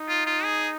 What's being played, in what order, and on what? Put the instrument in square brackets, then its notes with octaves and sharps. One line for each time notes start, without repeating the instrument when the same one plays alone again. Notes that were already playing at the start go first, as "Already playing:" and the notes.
Already playing: [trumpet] D#4
[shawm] F4
F4
G#4